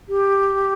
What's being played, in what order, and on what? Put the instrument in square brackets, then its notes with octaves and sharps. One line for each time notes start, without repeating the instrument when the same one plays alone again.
[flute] G4